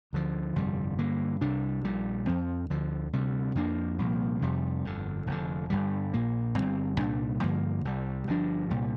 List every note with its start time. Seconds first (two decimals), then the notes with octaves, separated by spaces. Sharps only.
0.13 D2 D3 F3
0.56 G1 F2 C3 G3
0.99 G2 D3 A#3
1.41 C2 C3 G3 D4
1.84 A#1 A#2 G3
2.27 F2 F3 C4
2.70 D2 D3 F3
3.13 D2 C3 G3
3.55 F2 F3 A#3 D4
3.98 C2 A#2 F3 A#3
4.42 F1 F2 C3 G3
4.85 G1 F2 D3
5.27 F1 F2 D3
5.70 G1 G2 D3 G3
6.13 A#1 A#2 A#3
6.56 G1 G2 G3 C4
6.99 C2 A#2 G3 D4
7.42 G2 D3 F3 A#3
7.85 C2 C3 G3
8.27 G1 G2 F3 D4
8.70 C2 A#2 G3